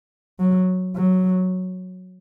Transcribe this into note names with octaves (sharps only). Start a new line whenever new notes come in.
F#3
F#3